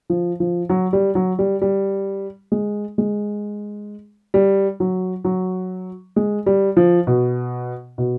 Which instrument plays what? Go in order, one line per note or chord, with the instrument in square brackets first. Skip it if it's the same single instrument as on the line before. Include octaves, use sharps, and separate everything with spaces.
[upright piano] F3
F3
F#3
G3
F#3
G3
G3
G#3
G#3
G3
F#3
F#3
G#3
G3
F3
B2
B2